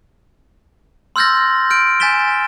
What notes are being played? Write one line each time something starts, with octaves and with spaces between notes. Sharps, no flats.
C6 E6 F6 G6 A6 A#6
F6 G6 D7
G#5 G6 A6 B6 E7 G7